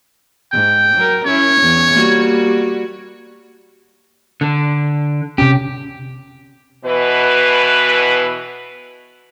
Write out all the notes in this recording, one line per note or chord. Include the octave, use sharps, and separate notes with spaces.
G#2 G5
F#3 A#4
C#4 E4 C#5
E2
G3 A#3 F#4
D3
C3 C#4 G4
B2 E3 B4